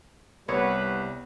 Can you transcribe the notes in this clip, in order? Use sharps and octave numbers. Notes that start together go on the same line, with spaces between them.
C2 G3 B3 B4 C#5